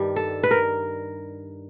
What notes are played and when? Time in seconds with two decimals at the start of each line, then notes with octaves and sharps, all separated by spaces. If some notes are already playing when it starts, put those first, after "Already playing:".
Already playing: G2 D#3 G3
0.16 A4
0.43 B4
0.51 A#4